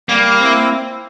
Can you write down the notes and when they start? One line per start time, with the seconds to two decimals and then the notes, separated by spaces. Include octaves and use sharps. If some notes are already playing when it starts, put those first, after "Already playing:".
0.09 G3 A#3
0.39 C4 E4